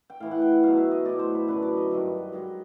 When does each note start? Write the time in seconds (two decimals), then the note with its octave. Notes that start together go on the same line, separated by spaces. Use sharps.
0.10 G5
0.20 A2 E3 F5
0.31 F#5
0.42 G5
0.52 F#5
0.63 B2 F#3 F5
0.77 E5
0.91 D#5
1.05 A2 F#3 D5
1.19 C5
1.35 B4
1.48 F#2 D3 F#3 B4
1.62 D5
1.76 D#5
1.91 G2 D#3 F#3
2.32 G#2 D#3 F#3 D#5